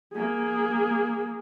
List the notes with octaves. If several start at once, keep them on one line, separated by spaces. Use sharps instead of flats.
A#3 G#4